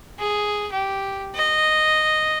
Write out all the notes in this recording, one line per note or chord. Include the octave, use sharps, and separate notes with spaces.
G#4
G4
D#5